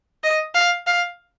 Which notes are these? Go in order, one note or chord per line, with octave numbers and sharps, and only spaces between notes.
D#5
F5
F5